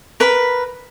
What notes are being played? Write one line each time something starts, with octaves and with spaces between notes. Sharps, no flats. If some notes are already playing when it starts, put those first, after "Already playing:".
A#4 B4 B5